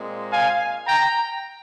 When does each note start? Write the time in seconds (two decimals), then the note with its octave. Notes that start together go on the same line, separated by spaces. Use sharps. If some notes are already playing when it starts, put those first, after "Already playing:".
Already playing: A#2 G#3 C4
0.31 F5 G#5
0.87 G5 A#5